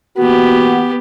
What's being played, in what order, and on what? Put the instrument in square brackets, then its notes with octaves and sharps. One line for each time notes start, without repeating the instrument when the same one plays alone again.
[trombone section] E3 A#3 F#4 [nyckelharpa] B3 G4